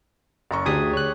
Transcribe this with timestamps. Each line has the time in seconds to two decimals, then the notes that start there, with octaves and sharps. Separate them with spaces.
0.51 F#1 A#5 C#6
0.66 D2 D4 G4 G#4 D#6 G#6
0.93 C#5 F#6